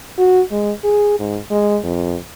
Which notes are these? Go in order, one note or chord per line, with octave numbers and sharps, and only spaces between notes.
F#4
G#3
G#4
G#2
G#3
F2